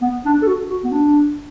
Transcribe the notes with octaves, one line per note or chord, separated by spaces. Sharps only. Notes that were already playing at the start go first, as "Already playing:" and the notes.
B3
D4
A4
F#4
F#4
B3
D4